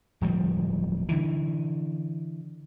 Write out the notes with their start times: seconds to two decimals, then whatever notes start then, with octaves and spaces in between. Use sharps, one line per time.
0.21 D1 F3 G3
1.09 D3 E3